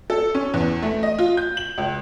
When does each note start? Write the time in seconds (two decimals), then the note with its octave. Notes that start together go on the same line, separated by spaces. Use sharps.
0.10 A4
0.35 C#4
0.54 E2
0.82 A3
1.03 D#5
1.19 F4
1.37 G6
1.57 F#7
1.78 C#2